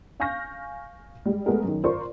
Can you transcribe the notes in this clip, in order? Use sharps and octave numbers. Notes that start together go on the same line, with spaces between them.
F5 G#5 C#6 F6 G6 A#6
G3 G#3
G#3 A3 B3 G#4 A#4
F#2 D#3
F4 A#4 C5 D5 C6 C#6